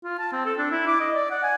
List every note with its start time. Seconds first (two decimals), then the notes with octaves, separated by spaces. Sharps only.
0.04 F4
0.19 A5
0.32 C4
0.46 A4
0.58 D4
0.71 E4
0.87 D6
1.01 D#5
1.14 D5
1.31 F#5
1.43 G#5